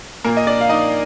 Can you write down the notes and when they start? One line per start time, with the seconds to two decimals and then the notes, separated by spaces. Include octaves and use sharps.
0.24 A#2 A#3 A#4
0.37 D#5
0.47 D4 D5
0.61 F5
0.69 D4 D#4 D#5